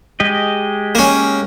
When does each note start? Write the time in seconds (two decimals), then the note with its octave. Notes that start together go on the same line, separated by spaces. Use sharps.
0.20 G#3 G4 D#5
0.95 A#3 C#4